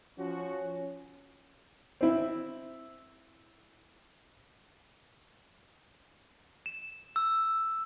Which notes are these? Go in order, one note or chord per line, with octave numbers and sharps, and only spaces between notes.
F3 C#4 F#4
C4 E4
E7
E6